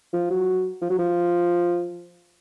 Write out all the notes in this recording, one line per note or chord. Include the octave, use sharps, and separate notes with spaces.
F3
F#3
F3
F#3
F3